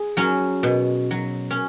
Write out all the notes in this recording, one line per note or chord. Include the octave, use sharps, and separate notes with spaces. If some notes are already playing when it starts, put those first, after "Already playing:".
Already playing: G#4
F#3 C#4
B2
F#3
C#4